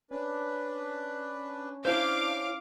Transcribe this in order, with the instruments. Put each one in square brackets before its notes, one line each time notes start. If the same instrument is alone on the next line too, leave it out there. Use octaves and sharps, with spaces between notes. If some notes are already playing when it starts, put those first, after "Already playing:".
[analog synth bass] C#4 [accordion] D4 B4
[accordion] D4 [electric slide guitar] E4 C5 [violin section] F5 D6